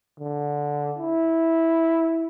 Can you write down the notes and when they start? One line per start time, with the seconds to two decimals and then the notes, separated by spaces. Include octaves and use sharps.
0.20 D3
0.98 E4